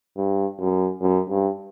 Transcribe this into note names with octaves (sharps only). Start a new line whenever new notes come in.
G2
F#2
F#2
G2